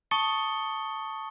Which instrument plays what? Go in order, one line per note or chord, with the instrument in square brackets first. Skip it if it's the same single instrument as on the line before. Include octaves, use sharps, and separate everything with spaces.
[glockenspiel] A5 C#6 D#6 A6 C#7 G7